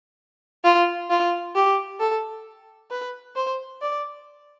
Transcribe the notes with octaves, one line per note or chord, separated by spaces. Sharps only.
F4
F4
G4
A4
B4
C5
D5